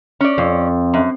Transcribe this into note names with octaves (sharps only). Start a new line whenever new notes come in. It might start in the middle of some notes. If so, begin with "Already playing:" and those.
C#4 D5
F2
F#2